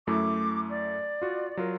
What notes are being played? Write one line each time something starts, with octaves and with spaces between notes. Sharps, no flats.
F#2 A3 E4 D6
D5
F4 F#4
F#3 F4 A#4